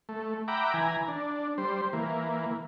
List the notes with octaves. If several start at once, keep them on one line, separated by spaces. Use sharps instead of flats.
A3
E5 F#5 G5 A#5 B5 D6
E3 G#5 A#5
D4
G3 C5
E3 A#3